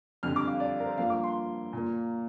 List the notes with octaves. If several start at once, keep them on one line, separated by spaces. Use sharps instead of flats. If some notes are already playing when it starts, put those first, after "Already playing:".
F2 D3 G3 F6
D6
F5
D5
A#4
C5
G2 F3 A#3 F5
D6
C6
A#2 A#3